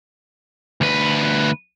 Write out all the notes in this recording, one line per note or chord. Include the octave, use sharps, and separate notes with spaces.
D2 B4